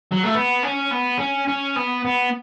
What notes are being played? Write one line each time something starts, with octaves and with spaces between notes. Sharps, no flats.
F#3
A3
B3
C#4
B3
C#4
C#4
B3
B3